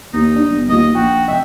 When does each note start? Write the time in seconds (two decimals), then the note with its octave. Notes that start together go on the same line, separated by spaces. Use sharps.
0.13 D#2 A#3 D#4
0.35 D4
0.50 G1
0.69 D#2 A#3 F4 D#5
0.95 A#1 F#4 G5
1.28 F1 D#5 E5 G5